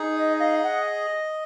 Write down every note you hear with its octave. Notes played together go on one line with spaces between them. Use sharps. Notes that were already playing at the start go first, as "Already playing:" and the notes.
Already playing: D#4 G#4
D#5
D#5 F5
F#5